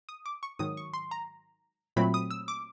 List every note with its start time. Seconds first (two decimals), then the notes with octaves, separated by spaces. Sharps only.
0.09 D#6
0.26 D6
0.43 C#6
0.59 G#2 D#3 F#3 D#6
0.77 C#6
0.93 C6
1.11 A#5
1.96 A#2 F#3 A3 C4 B5
2.14 D#6
2.30 E6
2.48 D6